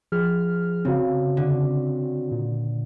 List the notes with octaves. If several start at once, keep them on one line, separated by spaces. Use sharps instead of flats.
F3 G#4 F6
C#3 C4 F#4
D3
A#2